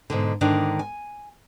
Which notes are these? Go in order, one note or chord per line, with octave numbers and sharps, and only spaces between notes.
G#2 B2 D3
G#2 D3 D#3 D4
G#5